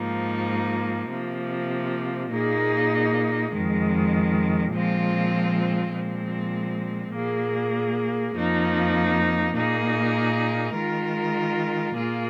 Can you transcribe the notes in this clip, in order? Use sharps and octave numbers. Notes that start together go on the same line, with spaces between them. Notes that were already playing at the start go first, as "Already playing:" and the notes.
Already playing: G#2 F3 A#3 D#4
C3 F3 A#3
A#2 A#3 D#4 G#4
F2 D#3 G#3
A#2 F3 G#3 C4 F4
A#2 F3 G#3 C4
A#2 A#3 G#4
F2 F3 A#3 D#4
A#2 A#3 D#4 G#4
D#3 G#3 F4 A#4
A#2 A#3 F4 G#4